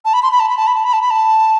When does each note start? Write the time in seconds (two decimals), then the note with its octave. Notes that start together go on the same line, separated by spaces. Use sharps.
0.05 A5
0.14 B5
0.23 C6
0.32 B5
0.40 A5
0.49 B5
0.57 A5
0.67 B5
0.75 A5
0.85 B5
0.93 A5
1.01 B5
1.11 A5